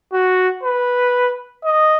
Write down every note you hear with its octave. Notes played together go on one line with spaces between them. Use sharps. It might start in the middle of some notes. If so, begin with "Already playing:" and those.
F#4
B4
D#5